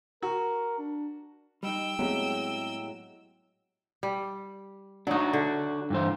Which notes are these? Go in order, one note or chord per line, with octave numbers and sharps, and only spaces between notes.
F#4 A#4
D4
G3 D#4 D#5 G5 E6
A2 F#3 G#3 B3 C4 F#4 G4
G3
F#3 D4 D#4 F#4
D3
G2 E3 C5